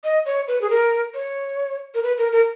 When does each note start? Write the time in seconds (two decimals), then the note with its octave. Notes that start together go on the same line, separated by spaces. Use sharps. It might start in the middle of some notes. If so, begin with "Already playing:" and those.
0.04 D#5
0.26 C#5
0.48 B4
0.61 G#4
0.70 A#4
1.14 C#5
1.95 A#4
2.03 B4
2.18 A#4
2.32 A#4